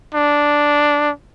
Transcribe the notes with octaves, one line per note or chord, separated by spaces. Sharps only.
D4